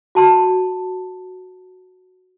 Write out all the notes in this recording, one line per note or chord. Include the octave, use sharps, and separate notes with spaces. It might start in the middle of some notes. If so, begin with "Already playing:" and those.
F#4 A5 C6